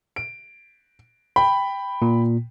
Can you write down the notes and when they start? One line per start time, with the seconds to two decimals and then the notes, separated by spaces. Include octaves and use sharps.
0.16 D7
1.36 G5 B5
2.02 A#2